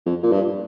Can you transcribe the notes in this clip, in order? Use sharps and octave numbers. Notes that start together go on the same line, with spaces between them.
F2
A#2
G2